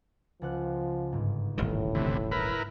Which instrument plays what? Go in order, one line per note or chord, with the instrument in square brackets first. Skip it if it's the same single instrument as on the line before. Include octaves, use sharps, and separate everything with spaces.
[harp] C#2 F#5 F#6 [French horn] F3
[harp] G1 G#2
[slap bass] D#1 A1 D#3 [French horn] A2
[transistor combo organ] D2 C3 E3 [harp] E6
[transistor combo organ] E4 A#4 B4